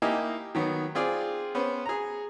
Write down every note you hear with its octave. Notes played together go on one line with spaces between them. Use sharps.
A#3 D#4 E4 G4 D#5 G#5
D#3 F#3 B3
C4 F4 G#4 D5
B3 C#4 B4 C5
G#4 A#5